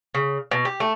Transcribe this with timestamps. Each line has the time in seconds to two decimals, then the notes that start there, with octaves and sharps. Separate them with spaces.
0.15 C#3
0.51 B2
0.65 G4
0.80 A3